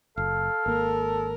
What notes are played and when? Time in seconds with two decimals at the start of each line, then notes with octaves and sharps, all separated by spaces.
0.17 F#1 A4 F5
0.66 G#1 A#3 A#4